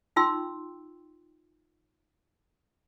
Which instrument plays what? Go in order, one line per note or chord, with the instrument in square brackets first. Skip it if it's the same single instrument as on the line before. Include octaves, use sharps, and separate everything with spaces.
[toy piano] D#4 F4 G5 C6 E6